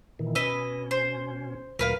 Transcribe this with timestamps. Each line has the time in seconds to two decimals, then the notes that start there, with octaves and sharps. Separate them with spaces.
0.19 A#2 D#3 E3
0.35 B2 C#4 B4 D#5 E6
0.91 C5
1.79 D2 A#2 F#3 A#4 B4 F5